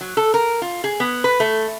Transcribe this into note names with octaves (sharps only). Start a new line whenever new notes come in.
F#3
A4
A#4
F4
G#4
B3
B4
A3